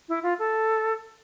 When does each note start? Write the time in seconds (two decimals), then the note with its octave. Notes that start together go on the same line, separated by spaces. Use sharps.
0.09 E4
0.23 F4
0.39 A4